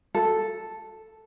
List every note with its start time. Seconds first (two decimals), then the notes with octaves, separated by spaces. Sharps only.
0.15 A4